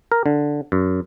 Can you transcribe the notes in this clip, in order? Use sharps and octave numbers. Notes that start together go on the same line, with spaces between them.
A#4
D3
F#2